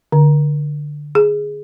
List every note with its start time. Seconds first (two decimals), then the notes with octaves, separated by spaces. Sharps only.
0.12 D3
1.15 G#4